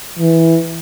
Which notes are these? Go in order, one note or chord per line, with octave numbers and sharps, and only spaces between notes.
E3